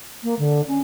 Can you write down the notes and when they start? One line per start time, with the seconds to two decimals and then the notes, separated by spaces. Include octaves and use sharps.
0.23 A#3
0.39 D3
0.67 C#4